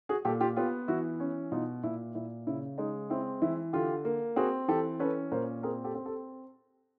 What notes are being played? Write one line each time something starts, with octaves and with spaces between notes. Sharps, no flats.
F#4 G#4
A#2 G4 A4
F4 G4
B3 F4 G4
E3 E4 F#4
C#4
B2 D#4 F4
A#2 E4
A#2 E4
C#3 E4
G#3 D#4
C4 E4
E3 E4
D3 F4 G4
A#3
C4 F#4 G#4
E3 G4 A4
C#4 A4 B4
A#2 A#4 C5
C4 G#4 A#4
G4 A4
C4
G4 A4